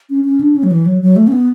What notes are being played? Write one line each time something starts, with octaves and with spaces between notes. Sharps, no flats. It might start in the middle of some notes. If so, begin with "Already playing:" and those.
C#4
C#4
D4
C#4
F#3
E3
F#3
F#3
A3
C#4
B3